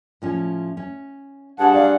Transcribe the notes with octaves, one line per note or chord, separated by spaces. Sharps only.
A2 F3 C#4
C#4
G2 G#4 F#5 A5
D5 F5